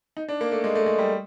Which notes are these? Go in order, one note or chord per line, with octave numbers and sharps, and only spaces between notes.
D#4
D4
A#3
A3
G#3
A3
G#3
G3